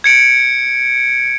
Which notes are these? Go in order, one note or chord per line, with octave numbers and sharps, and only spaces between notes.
G#6 C#7 D7